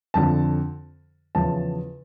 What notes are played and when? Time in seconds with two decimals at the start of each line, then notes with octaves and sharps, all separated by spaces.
0.14 F2 D3 F3 A5
1.35 E2 C#3 F3 A5